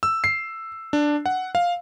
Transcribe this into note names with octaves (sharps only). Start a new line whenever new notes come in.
E6
C7
D4
F#5
F5